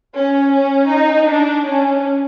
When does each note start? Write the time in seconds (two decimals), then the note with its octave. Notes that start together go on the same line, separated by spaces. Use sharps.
0.17 C#4
0.55 C#4
0.92 D#4
1.29 D4
1.68 C#4